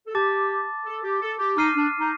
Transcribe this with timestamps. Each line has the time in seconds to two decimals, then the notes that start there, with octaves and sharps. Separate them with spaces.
0.07 A4
0.15 G4 A5 D6 A6
0.86 A4
1.04 G4
1.21 A4
1.39 G4
1.57 D#4 D6 F6 C7 D#7
1.75 D4
1.99 D#4